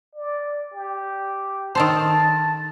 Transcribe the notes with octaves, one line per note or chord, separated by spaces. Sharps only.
D5
G4
D#3 A4 C5 A5